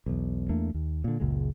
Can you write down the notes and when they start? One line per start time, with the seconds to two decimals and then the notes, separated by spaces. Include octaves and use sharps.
0.06 B1 E2
0.49 E2 A3 A#3 D4
0.74 D#2
1.04 A#2 D3
1.20 F#1 C#2 A#2 G#3